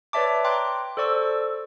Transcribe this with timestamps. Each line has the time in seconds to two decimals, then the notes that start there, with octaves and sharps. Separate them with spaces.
0.13 B4 C#5 D5 E5 A5 D6
0.44 G5 A#5 C6 D6 F#6
0.97 A4 C5 D5 C#6 E6